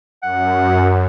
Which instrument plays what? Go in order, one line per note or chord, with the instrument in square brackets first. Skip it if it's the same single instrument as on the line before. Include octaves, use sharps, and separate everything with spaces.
[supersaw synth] F#2 [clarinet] F#5